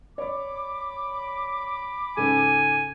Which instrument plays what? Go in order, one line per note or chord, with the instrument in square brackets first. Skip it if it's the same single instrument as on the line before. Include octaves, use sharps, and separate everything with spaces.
[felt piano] C#5 D5 [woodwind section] B5 D6
[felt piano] G#2 C#3 A4 [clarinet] G#5